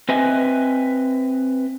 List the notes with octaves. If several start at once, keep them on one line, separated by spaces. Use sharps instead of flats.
C4 B4 D#5 E5 G#5